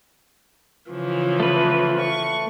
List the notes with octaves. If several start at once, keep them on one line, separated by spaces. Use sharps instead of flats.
C#3 E3 F3
A3 B4
C#6